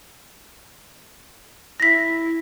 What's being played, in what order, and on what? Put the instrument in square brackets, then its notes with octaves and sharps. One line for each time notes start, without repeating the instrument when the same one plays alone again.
[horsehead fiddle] E4 [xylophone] A#6 B6